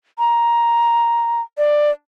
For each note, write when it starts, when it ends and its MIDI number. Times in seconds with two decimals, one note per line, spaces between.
0.19 1.41 82
1.58 1.91 74